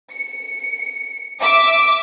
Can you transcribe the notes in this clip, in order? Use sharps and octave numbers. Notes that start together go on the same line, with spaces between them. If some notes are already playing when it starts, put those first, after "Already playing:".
C#7
E5 D6